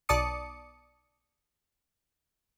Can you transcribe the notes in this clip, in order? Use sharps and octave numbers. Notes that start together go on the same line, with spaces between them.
B1 D5 A5 D6 D#6 C#7